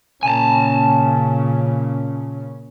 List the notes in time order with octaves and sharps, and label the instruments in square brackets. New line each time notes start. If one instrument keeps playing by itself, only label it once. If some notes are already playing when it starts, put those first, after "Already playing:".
[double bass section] A#2 C#3 C#4 [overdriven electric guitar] G#5 A5